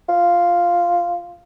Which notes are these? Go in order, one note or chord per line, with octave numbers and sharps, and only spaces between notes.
F4